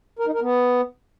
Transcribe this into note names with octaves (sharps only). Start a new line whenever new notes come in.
A#4
D#4
A#4
B3